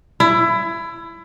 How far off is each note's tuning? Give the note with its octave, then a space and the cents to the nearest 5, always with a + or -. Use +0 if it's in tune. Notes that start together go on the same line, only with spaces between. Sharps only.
E4 +20